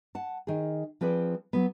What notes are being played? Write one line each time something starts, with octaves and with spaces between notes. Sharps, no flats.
F#5 A5
D#3 G#4
F3 C4 G#4 B4 D5
F#3 B3